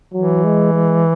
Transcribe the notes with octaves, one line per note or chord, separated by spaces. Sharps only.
E3 F#3
G#3
G#3